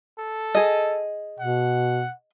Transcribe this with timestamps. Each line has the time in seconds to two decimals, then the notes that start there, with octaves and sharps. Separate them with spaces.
0.19 A4
0.55 G#4 D#5
1.39 B2 F#5